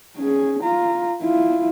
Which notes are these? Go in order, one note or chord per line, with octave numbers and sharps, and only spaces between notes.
C#4 G#4
F4 A#5
E4 F4